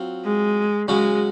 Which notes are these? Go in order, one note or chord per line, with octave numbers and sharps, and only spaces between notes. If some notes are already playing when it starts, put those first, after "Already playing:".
Already playing: F#3 C4 F4
G#3
C#3 F#3 G#3 C#4 F#4